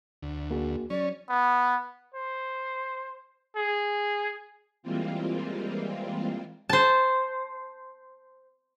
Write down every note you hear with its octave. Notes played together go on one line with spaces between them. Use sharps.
D2
A#3 F#4 G#4
F#3 C#4 D5
B3
C5
G#4
E3 G3 G#3 A#3 C4 F4
C5 A5